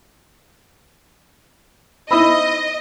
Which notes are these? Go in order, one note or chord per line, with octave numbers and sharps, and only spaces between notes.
D#4 E4 C5 D#5 B5 D#6 E6